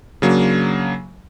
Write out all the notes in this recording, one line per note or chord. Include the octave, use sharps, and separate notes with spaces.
C#3 F#3 A#3 D4